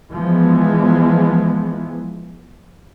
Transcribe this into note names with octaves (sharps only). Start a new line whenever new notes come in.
E3 F3 G#3 B3